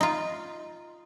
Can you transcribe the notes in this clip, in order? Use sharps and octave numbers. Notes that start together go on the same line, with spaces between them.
D#4 F4